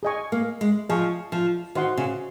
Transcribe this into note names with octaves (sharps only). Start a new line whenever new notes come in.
G#4 D#5 G#5 C#6
A#3
G#3
F3 G#4 D#5 G#5 C#6
F3
D#3 F#4 C5 D#5 F#5 C6
C#3